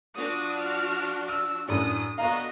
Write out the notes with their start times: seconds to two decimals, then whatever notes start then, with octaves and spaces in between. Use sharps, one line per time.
0.15 F3 D4 F#4 D#6
0.58 F6
1.28 E6 F6
1.68 F#2 A2 D4 D#6
2.18 D3 B3 F#4 D#5 F5 A#5